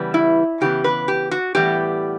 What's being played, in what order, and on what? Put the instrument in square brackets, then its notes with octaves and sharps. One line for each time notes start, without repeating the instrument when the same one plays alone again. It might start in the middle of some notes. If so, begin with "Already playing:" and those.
Already playing: [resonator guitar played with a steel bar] C#3 E3 G3 B3
E4
C#3 E3 B3 G4
B4
G4
F#4
A2 E3 G3 B3 G4